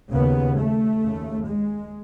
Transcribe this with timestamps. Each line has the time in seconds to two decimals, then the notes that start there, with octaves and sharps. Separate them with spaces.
0.13 D#2 C#3 B3
0.57 A3
1.03 D#2 C#3
1.48 G#3